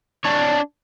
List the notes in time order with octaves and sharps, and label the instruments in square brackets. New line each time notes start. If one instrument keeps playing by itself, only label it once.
[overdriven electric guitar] D4 C#5